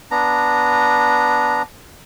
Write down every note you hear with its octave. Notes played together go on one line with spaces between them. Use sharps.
B3 D4 A#5